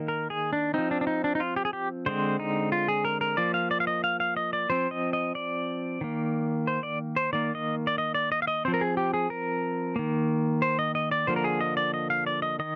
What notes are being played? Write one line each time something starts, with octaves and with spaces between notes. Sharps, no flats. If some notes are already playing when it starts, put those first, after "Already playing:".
Already playing: D#3 A#3
A#4
G#4
D4
F3 C4 D#4
D4
D4
D#4
D4
D#4
F4
G4
G#4
G4
D3 G#3 C4 C5
D#4
F4
G#4
A#4
A#4
F3 A#3 D5
F5
D5
F5
D#5
F5
F5
D#5
D5
F3 C4 C5
D#5
D#5
D5
D#3 A#3
C5
D5
C5
D#3 A#3 D5
D#5
D5
D#5
D5
D#5
F5
D#5
F3 C4 C5
A#4
G#4
G4
G#4
A#4
D#3 A#3
C5
D#5
D#5
D5
D3 F3 A#3 C5
A#4
G#4
D#5
D5
D#5
F5
D5
D#5
D#3 D#5